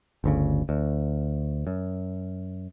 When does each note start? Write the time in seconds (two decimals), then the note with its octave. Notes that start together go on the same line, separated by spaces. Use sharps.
0.24 G1 D2 C#3
0.69 D2
1.67 F#2